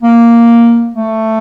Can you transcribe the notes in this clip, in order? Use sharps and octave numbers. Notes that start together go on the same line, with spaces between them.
A#3
A3